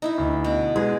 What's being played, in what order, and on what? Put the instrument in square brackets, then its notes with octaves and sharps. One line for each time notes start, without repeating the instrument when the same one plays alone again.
[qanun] D#4 E4 E5
[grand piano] D2
[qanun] B2
[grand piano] G#3 B3 [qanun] G#4